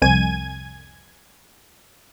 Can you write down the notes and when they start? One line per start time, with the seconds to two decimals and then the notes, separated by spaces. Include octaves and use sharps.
0.02 C2 F2 G#5 G#6 D#7